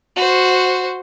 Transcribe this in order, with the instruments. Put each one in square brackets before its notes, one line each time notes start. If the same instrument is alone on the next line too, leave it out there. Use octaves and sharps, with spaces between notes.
[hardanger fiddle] F#4 C5